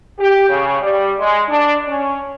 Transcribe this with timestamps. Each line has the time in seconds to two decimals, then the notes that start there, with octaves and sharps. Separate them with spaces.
0.18 G4
0.48 C#3
0.80 G3
1.19 G#3
1.47 D4
1.87 C#4